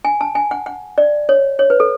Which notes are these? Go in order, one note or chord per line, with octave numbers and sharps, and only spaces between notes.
G#5
A5
G#5
F#5
F#5
D5
C#5
C#5
B4
A4